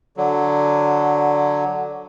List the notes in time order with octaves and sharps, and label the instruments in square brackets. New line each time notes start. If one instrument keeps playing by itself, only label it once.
[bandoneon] D3 F#3